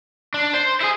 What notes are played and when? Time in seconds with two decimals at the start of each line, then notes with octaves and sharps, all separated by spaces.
0.34 D4
0.54 C5
0.81 E4 G#4